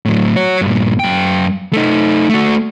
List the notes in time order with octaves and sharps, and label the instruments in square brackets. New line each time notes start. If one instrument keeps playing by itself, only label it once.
[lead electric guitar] A2 F#3
F#4 C#5
G2 A#2
F#2 G5
A3 D#4
A3 F#4